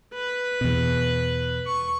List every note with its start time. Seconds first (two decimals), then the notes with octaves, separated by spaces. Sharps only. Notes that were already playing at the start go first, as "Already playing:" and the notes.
0.14 B4
0.61 E2 B2
1.67 C#6